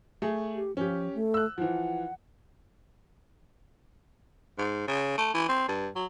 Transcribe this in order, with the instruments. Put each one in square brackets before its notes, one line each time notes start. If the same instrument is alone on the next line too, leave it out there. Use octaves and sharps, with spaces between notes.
[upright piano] A3 G#4
[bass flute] G4
[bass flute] F3 [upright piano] C#4 G4
[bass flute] A3
[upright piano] E6 F#6
[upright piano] E3 F3 [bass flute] F#5
[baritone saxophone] G#2
C#3
A3
E3
C4
G2
F#3